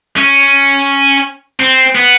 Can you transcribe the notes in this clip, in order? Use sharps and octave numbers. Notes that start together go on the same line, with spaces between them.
C#4
C4
B3